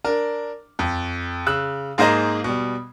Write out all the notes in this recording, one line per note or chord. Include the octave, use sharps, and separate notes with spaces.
D4 A#4
F2
C#3 E6 F#6
G#2 A#3 G#4 C5 D#5 A#5
B2 G3